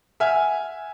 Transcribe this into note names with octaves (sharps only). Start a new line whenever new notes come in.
E5 F#5 G#5 F6